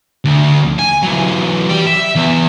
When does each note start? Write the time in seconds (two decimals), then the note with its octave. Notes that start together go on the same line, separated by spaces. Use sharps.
0.25 D2
0.79 G#5
1.03 E3 F#3
1.69 G4 D5
1.87 E5
2.15 E2